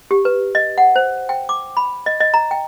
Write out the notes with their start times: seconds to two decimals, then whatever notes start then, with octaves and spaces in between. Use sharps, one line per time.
0.11 G4
0.25 B4
0.55 D#5
0.78 F#5
0.96 C5
1.29 G5
1.49 D6
1.77 B5
2.06 D#5
2.20 D#5
2.34 A#5
2.51 G5